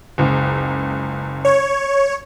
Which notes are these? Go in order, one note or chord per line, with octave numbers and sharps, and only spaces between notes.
F#1 C#2
C#5